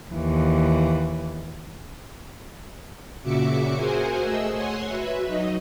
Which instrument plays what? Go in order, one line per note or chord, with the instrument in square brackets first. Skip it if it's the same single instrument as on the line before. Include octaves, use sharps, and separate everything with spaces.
[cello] D#2 E3
[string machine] A#2 C#3 F#4 E5 D6 C#7
F#4 G#4 A#4 C5 F#5 G#5
A3 G#4 D#5 E6
C#5 F#5 G#5 C6
F#4 B4 E5
F#3 D#4 D#5